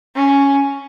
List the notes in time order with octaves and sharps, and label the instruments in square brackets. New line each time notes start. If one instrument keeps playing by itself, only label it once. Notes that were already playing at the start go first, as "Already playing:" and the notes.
[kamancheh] C#4